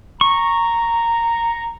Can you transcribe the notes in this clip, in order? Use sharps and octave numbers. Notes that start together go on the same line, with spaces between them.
A#5 C#6